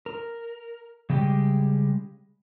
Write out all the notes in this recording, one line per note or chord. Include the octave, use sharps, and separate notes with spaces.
A#4
C#3 G3 G#3 G4 G5